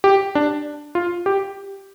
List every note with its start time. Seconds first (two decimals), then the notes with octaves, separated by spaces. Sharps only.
0.04 G4
0.35 D4
0.95 F4
1.26 G4